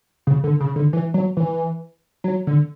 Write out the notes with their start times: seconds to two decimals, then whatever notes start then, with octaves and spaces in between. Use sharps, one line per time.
0.27 C#3
0.44 D3
0.60 C#3
0.76 D3
0.93 E3
1.14 F#3
1.37 E3
2.24 F#3
2.47 D3